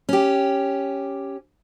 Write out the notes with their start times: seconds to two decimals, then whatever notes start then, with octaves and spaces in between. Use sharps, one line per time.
0.09 C#4 G4